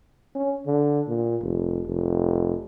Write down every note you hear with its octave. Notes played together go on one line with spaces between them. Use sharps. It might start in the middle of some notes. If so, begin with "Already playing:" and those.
C#4
D3
A#2
F1
F1